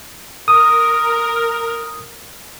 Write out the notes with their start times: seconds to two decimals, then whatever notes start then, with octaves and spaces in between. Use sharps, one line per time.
0.48 A#4 D#6